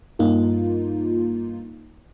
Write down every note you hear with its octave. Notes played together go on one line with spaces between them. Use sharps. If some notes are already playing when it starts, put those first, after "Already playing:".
G2 A#3 D#4 F4